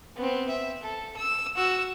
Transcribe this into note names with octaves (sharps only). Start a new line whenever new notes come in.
B3 C4
E5
A4
E6
F#4 E6